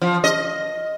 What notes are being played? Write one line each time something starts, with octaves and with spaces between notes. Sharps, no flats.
F3
D#5